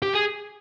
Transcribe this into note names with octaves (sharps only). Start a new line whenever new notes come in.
G4
G#4